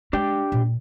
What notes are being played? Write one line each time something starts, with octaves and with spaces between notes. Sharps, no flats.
G#3 D4 G4 G5
A#2